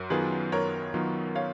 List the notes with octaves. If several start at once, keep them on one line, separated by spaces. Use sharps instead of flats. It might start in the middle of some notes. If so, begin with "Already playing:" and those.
Already playing: F#2 F#4 A#4
D#3 F#3 B3 F4 G#4 B4
F#2 A#4 C#5
D#3 F#3 B3 F4
C#5 F5